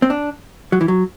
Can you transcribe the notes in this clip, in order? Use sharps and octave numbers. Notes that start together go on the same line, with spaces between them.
C4
D4
F#3
E3
F#3